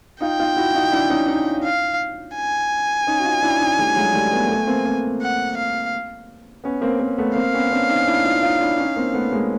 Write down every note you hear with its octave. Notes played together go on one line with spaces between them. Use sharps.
D#4 F4 G5
D#4 F4
E4 F#4
D#4 F4
D4 E4
C#4 D#4
C#4 D#4
F5
G#5
C#4 D#4
F#4
D#4 F4
D4 E4
C#4 D#4
G3 A3
F#3 G#3
G3 A3
A3 B3
A#3
A3 B3
A#3 C4
A#3 C4
F#5
F5
B3 C#4
A#3 C4
A#3 C4
A3 B3
A#3 C4 F5
B3 C#4
C4 D4
C#4 D#4
D4 E4
D#4 F4
D#4 F4
D4 E4
C#4 D#4
A#3 C4
A3 B3
G#3 A#3